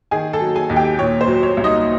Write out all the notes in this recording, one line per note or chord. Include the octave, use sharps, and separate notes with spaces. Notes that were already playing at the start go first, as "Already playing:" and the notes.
D#3 G#4 G#5
A4 A5
F#3
G#4 G#5
D#2
G4 G5
A#2 C#5
C5
F#3
C#5
C2
D#4 D#5